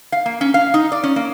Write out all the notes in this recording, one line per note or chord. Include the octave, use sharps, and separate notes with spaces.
F5
A#3
C#4
F5
D#4
D5
C#4
A#3